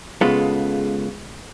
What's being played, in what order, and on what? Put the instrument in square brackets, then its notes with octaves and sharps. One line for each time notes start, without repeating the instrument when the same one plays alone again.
[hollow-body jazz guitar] C#3 G#3 B3 F4 A4